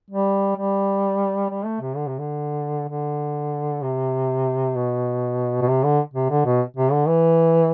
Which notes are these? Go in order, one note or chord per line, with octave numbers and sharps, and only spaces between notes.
G3
G3
G3
A3
C3
D3
C3
D3
D3
C3
B2
B2
C3
D3
C3
D3
B2
C3
D3
E3